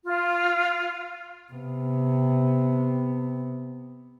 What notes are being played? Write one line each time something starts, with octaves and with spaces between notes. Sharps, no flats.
F4
C3 B3